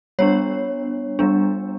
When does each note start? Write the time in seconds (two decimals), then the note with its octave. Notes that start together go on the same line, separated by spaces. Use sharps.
0.19 G3 B3 D4 C#5
1.19 G3 B3 D4